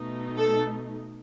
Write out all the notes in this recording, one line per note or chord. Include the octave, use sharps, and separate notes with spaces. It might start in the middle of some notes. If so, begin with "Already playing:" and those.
Already playing: B2 A3 D#4
A4